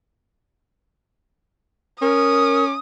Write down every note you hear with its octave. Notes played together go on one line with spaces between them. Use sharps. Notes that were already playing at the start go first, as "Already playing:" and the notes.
C#4 A#4 D#6